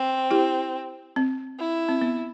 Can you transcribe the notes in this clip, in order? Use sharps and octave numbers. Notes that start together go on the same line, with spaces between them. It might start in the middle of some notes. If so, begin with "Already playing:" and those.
Already playing: C4
E4 G4
C4
E4
C4
B3